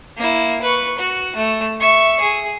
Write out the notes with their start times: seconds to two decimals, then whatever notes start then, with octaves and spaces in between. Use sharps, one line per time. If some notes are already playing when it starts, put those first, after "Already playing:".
0.17 A#3 E4
0.62 B4 C#6
0.99 F#4
1.36 A3
1.80 E5 C#6
2.21 G#4